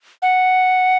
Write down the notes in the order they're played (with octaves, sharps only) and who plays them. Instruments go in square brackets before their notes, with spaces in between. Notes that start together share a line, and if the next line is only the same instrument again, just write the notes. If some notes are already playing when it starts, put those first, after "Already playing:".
[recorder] F#5